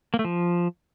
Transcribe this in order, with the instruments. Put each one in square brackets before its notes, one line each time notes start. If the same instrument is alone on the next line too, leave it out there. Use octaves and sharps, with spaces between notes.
[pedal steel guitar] A#3
A3
F3